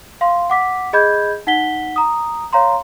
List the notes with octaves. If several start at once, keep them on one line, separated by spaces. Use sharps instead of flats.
F5 C6
F#5 D6 B6
G#4 D#5 B5 G6 G#6
D#4 F#5 B6 G7
A#5 D#6
C#5 F5 A#5 C6